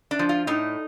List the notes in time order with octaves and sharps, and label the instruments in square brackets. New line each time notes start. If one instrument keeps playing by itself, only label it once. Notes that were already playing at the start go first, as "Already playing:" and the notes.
[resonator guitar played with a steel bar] D4
F3
F4
A2 D#4